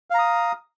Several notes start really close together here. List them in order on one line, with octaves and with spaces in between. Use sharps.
F5 A#5 D#6